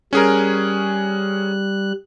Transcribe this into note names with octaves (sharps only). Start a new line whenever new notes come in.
G3 C#4 G#4 A#4 F#6